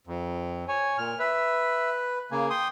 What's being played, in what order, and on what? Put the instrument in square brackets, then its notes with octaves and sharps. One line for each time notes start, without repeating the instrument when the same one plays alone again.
[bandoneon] F2
[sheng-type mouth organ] C#5 G#5
[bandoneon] A#2 [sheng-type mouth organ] F6
[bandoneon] B4 [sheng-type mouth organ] E5
[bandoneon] C#3 A#3 [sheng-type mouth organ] G#5
[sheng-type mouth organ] G5 [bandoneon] C6 D#6